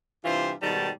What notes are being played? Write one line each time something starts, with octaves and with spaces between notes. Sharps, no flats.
G2 C3 E3 F4 C5
G#2 B2 D#3 G3 A5